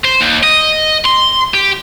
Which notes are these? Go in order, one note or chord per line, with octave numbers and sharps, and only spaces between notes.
C5
D#2
D#5
C6
G4